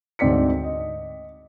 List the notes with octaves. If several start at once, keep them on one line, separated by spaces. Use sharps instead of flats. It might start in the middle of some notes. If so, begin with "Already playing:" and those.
D2 G#2 C4 D5 B6 C#7
D#5